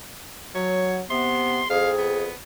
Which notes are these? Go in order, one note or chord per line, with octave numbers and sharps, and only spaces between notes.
F#3 C#5
C3 B3 C6
F2 G#4 F5
B3